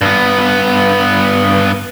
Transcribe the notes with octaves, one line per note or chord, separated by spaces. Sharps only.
G2 B3